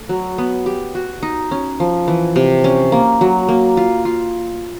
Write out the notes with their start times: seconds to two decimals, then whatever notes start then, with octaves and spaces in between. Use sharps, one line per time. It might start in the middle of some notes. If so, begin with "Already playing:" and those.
Already playing: A3
0.09 F#3
0.38 B3
0.66 G4
0.95 F#4
1.23 D#4
1.51 C#4
1.80 F3
2.08 E3
2.36 C3
2.64 C#4
2.92 A#3
3.21 F#3
3.49 A#3
3.77 F4
4.05 F4